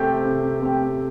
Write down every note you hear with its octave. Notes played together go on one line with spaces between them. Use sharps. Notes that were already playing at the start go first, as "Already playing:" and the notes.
Already playing: C3 A3 C4 G4
C3
A3 C4 G4